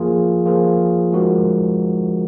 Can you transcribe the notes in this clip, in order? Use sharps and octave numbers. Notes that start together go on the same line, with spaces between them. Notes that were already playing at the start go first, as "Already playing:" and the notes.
Already playing: F3 A#3 F4 G#4
F3 A#3 F4 G#4
F3 G#3 D#4 F#4 A#4